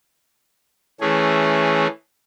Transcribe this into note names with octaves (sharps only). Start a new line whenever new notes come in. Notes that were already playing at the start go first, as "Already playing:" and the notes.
E3 A3 C#4 G#4